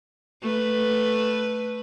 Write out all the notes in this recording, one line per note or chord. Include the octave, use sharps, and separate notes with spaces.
A3 B4